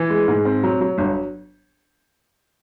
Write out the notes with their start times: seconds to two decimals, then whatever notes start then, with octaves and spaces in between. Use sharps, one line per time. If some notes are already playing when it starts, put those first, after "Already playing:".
Already playing: E3
0.10 G#3
0.28 G#2
0.45 C4
0.63 F#3
0.81 F#3
0.98 G1